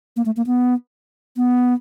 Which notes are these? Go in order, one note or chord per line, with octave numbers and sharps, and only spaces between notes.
A#3
A3
A#3
B3
B3